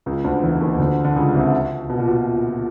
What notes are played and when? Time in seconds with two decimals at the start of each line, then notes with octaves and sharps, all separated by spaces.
0.06 C#2 C#3
0.24 D2 D3
0.42 E2 E3
0.61 D#2 D#3
0.79 D2 D3
1.04 D3
1.16 C#2 C#3
1.34 C2 C3
1.90 B2
1.99 A#2
2.08 B2